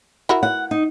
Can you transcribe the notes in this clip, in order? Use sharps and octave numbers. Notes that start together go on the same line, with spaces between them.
E4 F#4 A#4
F#5
D#4